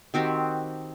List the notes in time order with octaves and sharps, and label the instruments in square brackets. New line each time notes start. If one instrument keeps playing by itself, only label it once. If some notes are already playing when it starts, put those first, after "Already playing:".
[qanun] D#3 C4 F#4 G4